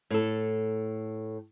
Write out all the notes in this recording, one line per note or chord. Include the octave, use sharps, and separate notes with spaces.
A2 A4